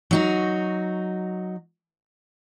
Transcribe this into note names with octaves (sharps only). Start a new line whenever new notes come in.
F#3 D#4 F#4